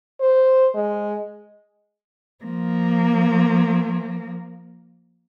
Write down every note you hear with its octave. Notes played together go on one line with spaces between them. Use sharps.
C5
G#3
F3 A#3